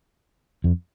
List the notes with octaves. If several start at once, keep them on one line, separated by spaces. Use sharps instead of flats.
F2